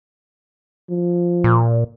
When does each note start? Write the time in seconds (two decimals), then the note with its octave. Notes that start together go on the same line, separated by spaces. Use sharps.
0.90 F3
1.44 A#2